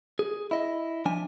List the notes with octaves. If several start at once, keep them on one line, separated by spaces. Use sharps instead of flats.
G#4
E4 D#5
F3 D4 G#5